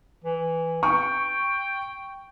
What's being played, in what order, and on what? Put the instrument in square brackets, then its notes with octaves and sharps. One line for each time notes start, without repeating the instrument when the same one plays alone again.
[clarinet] E3
[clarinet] G5 [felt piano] C#6